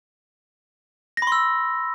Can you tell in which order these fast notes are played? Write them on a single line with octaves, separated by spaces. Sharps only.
A#6 B5 C6 E6